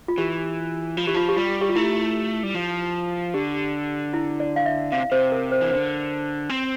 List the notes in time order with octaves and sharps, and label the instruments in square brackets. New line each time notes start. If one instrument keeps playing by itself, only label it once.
[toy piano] F4
[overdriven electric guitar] E3 [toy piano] G4
[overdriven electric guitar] F3 [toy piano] F4
[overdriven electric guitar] E3 [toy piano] G4
[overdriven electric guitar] F3 [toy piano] F4
[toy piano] G4
[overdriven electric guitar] G3 [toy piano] F4
[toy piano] G4
F4
[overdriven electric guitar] A3 [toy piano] E4
[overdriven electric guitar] G3
F3
[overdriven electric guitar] D3 [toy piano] G4
[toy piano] E4
D5
F5
E5
[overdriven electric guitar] C3 [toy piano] F5
[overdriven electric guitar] C3 [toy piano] C5
[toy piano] A#4
C5
[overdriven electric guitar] E3
[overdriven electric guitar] D3 [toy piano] C5
[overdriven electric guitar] C4